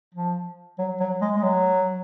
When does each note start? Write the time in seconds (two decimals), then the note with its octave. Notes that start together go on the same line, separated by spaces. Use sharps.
0.14 F3
0.79 F#3
1.00 F#3
1.21 G#3
1.36 G#3
1.43 F#3